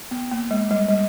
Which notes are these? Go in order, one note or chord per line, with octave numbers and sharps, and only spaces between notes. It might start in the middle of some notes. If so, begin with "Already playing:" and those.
B3
A#3
G#3
G3
G3